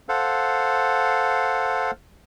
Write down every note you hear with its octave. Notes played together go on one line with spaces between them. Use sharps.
A4 C5 F5 F#5